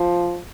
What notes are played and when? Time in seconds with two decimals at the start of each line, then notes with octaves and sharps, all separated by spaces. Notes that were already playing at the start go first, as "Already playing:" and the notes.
Already playing: F3